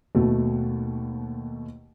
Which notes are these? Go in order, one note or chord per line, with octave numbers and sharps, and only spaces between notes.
D#2 B2 A3